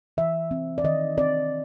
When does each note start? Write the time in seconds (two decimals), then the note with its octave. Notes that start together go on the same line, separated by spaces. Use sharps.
0.17 E3 E5
0.51 C4
0.78 D5
0.84 D#3 D#5
1.17 C4 D5